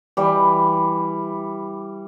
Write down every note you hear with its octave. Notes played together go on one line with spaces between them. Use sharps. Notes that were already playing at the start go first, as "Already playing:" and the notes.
E3 G3